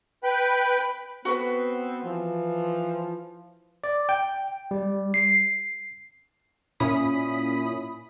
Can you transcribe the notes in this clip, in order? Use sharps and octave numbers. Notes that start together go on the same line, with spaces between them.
B4 G5 B5
B3 C4 F#4 B4
E3 F3
D5
G5
G3
C7
A#2 C#4 E4 B5 D#6 B6